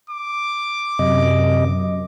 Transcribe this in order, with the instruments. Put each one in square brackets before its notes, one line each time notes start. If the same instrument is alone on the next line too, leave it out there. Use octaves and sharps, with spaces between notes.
[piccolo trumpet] D6
[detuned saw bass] F#2 [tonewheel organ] C3 D#5